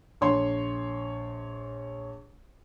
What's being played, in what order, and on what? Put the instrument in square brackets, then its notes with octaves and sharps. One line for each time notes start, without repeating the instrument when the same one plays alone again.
[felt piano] A#1 C#5 C6